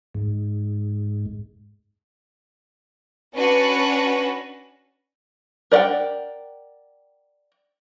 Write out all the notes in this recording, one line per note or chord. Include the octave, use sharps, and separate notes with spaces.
G#2
C#4 D4 F#4 B4 C#5
A#4 D5 D#5 F#5 G5